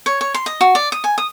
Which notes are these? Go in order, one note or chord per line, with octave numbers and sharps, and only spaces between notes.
C#5
C#5
C6
D#5
F#4
D5
D#6
G#5
D#6